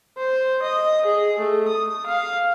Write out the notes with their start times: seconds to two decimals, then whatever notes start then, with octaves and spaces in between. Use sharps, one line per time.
0.17 C5
0.62 D#5
1.05 G#4
1.38 A3
1.68 D#6
2.06 F5